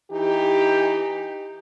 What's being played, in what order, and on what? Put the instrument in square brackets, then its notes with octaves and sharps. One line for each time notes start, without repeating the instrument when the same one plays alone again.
[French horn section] E3 D#4 G4